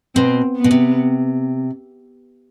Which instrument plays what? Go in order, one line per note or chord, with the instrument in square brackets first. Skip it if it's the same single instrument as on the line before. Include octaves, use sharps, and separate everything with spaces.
[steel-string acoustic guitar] B2 [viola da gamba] C4
[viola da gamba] B3
[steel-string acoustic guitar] B2
C3